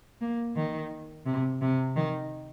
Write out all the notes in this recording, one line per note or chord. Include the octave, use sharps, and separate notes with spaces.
A#3
D#3
C3
C3
D#3